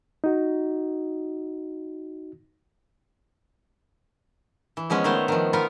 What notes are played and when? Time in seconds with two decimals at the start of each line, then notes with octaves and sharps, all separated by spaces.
0.24 D#4 F#4
4.77 E3
4.90 F3 G#3 B3 C#4
5.04 D#3 A3 B3 C5 C#5
5.28 D#3 F3
5.53 B3 D#4 F4 A#4 F5